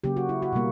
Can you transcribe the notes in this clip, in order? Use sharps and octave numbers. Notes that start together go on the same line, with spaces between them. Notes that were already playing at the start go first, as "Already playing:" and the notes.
C#3 F#3 A#3 G4
F#4
E4
F#4
B2 G3 A#3